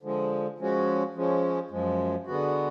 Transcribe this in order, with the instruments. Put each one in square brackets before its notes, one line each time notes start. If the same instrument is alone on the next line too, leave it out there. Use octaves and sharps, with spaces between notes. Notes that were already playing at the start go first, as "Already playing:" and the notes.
[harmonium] D3 F3 G#3
F3 G#3 C#4 F#4
F3 G#3 C#4
F#2 F3 G#3
D3 G#3 B3 F#4